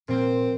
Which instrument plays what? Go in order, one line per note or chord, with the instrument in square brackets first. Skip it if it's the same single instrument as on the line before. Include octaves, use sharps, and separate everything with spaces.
[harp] A#2 F3 A#3 [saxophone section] C4